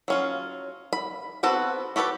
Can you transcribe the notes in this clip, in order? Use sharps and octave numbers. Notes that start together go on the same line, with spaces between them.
F#3 C#4 F4
B5
B3 C4 F#4 A4 B4
F#4 G4 A4 B4 G5